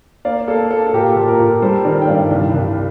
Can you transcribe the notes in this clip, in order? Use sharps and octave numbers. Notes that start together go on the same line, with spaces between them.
A#3 D5 F5
A#3 A4
A#3 A4
A4
A#2 G4 A#4
A#2 A4
A#4
A#2 A4
G3 A4 C5
D#3 A#4 D5
G5
G2 D5 F5
C2
C2